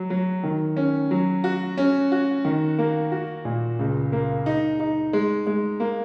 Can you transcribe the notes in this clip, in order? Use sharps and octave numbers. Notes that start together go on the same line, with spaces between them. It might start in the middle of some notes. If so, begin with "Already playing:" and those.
Already playing: F#3
F#3
D#3
C#4
F#3
F#4
C#4
F#4
D#3
A#3
F#4
A#2
C#2
A#3
D#4
D#4
G#3
G#3
A#3